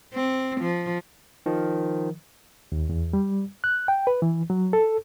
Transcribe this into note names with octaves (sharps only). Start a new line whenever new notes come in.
C4
F3
D#3 F3
D#2
E2
G3
F#6
G5
B4
E3
F#3
A4